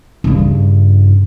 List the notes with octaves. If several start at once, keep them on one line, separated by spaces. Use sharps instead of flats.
G2 C#3